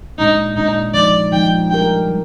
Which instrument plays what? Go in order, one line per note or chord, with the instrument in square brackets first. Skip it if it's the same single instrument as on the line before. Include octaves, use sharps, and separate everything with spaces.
[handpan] A#2 G#3 D4 [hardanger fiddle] D#4
[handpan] A#2 G#3 D4 [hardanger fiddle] D#4
[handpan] F3 G#3 D#4 [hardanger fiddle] D5
[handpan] F3 G#3 D#4 [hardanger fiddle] G5
[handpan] G3 D4 G4 A#4 [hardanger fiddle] G5
[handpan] G3